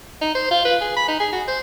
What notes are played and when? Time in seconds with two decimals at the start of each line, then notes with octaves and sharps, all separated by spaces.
0.21 D#4
0.35 C5
0.51 F4
0.65 B4
0.81 G#4
0.97 B5
1.08 D#4
1.20 G#4
1.33 F#4
1.48 C5